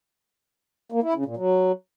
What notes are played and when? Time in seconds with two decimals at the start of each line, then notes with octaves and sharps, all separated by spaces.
0.92 A#3
1.03 E4
1.14 C#3
1.26 A#2
1.37 F#3